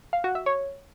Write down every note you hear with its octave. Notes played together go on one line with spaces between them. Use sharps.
F5
F#4
E5
C#5